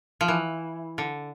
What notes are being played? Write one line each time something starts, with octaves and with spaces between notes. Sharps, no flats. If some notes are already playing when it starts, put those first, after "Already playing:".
F3
E3
D3